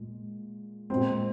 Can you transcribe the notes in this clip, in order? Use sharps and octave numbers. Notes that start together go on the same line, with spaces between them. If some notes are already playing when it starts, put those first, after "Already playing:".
Already playing: A#2 G#3
A#2 G#3 C4